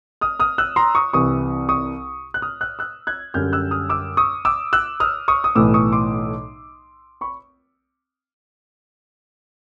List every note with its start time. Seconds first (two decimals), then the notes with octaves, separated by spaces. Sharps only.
0.21 D#6 F6
0.40 D#6 F6
0.58 E6 F#6
0.76 A#5 C6
0.95 C#6 D#6
1.13 C2 C3 E3 C#6 D#6
1.69 C#6 D#6
2.34 F#6
2.42 D#6 F6
2.61 E6 F#6
2.79 E6 F#6
3.07 F#6 G#6
3.34 F#2 D3 G3 F6 G6
3.53 E6 F#6
3.71 D#6 F6
3.89 D6 E6
4.17 C#6 D#6
4.45 D6 E6
4.73 E6 F#6
5.00 D#6 F6
5.28 C#6 D#6
5.44 D#6
5.55 B1 A2 E3 A3 D6 E6
5.74 C#6 D#6
5.93 C6 D6
7.21 B5 C#6